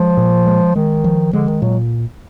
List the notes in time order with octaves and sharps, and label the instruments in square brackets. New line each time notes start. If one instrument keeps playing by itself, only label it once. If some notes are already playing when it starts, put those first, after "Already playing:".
Already playing: [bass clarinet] F3 [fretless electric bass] G#3
[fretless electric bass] A#2
G#3
[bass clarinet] D#3 [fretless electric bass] G#3
[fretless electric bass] F3
[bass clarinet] D3 [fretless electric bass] G#3
[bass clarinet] D#3
[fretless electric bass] A#2 [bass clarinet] F#3